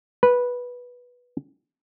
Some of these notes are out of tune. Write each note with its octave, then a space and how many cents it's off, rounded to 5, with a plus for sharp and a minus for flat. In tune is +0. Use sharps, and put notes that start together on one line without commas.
B4 -10